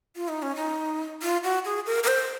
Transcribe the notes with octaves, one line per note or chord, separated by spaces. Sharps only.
F4
D#4
C#4
D#4
F4
F#4
G#4
A#4
A#4
C5